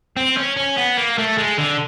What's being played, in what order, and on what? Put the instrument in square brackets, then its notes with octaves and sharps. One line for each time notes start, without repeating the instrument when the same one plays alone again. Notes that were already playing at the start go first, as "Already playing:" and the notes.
[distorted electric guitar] C4
C#4
C#4
B3
A#3
A3
G#3
D3